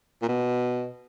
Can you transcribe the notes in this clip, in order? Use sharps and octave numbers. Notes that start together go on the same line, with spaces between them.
A#2
B2